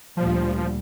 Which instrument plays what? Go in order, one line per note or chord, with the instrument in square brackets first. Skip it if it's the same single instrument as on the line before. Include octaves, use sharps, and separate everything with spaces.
[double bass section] D2 A#2 G3 [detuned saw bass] F3